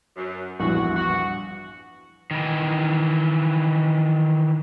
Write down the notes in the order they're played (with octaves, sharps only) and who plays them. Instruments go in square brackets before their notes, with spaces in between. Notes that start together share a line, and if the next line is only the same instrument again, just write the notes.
[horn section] F#2
[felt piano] A#1 E2 G2 [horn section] F#4
[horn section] F#4
[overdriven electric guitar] D#3 E3